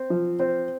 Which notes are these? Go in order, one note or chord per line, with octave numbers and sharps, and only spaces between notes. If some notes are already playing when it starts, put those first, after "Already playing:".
Already playing: C4
F3
C4